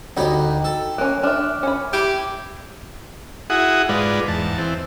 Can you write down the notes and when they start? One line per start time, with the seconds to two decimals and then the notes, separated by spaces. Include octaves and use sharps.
0.17 D2 D#4 G4 D#5 G5 B5
0.64 A4
0.98 A#3 C#4 F#6
1.23 D4 E5 D6 F6
1.63 C#4 B5
1.93 E4 G4
3.50 E4 F#4 G#4 F#5 D#6
3.89 G#2 G#3 F4 B4 D5
4.28 E2 G#2 A5
4.58 E3 C4